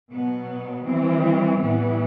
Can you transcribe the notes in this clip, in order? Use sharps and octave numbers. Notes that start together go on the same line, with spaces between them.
B2 F#3 B3
E3 G3 C4
A2 E3 G3 B3